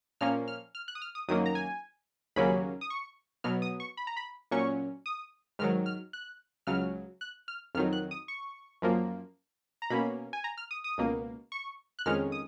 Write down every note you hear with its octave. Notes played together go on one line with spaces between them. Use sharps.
A#2 F3 A#3 C#4 F6
F6
F6
F#6
D#6
F6
D#6
F#2 D#3 F#3 A#3 D#6
A#5
G#5
D#2 C#3 F#3 A#3 C#4 B5
D#6
C#6
B2 F#3 B3 F6
D#6
C#6
B5
A#5
B5
A#2 F#3 C#4 C#6
D#6
G#2 D#3 F#3 F6
F6
F#6
C#2 C#3 F#3 F6
F#6
F6
F2 D#3 F#3 F6
F#6
D#6
C#6
F#2 F3 A#3
A#5
B2 A#3 C#4 B5
G#5
A#5
F6
D#6
D#6
C#2 B2 A#3
C#6
F#6
F2 D#3 G#3 C#4 F6
D#6